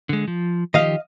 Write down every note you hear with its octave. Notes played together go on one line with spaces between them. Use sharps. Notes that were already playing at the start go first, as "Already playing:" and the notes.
D3 G#3
F3
D#3 F3 G4 D#5 F5